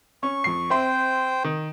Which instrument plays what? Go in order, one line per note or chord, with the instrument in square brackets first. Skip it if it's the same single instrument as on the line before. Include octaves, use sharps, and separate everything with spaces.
[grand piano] C#4 [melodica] C#6
[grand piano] F2 C7
[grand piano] C4 E5 C6 [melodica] C5 G5
[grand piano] D#3